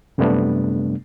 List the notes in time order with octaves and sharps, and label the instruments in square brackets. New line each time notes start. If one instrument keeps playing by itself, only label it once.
[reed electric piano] F#2 C3 G3 A3 B3 D4